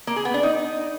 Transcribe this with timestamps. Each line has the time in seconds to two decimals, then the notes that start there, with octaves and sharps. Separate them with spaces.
0.07 A#3
0.16 G#4
0.25 B3
0.34 D4
0.43 D#4